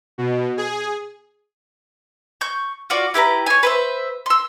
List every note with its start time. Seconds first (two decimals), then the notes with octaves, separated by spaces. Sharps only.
0.18 B2
0.57 G#4
2.41 C#6 G6
2.90 F4 F#4 D5
3.14 E4 G4 B4 A#5
3.46 C#5 G#5
3.63 B4 C5 E5
4.26 C6 E6